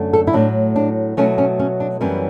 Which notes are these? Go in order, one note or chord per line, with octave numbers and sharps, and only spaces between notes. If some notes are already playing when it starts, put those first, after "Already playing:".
Already playing: F#2 D3 A3
A4
E4
A2 F#3 A3 D4
D4
B2 F#3 A3 C#4
C#4
C#4
D4
F#2 E3 G3 B3 C#4